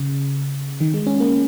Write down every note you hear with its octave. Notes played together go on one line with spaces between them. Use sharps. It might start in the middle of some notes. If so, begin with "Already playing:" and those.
Already playing: C#3
D#3
G#3
C#4
A#3